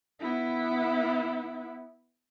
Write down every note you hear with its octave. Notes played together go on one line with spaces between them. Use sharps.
B3 E4